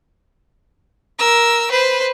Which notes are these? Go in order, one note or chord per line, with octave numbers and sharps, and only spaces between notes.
A#4 E6
B4 C5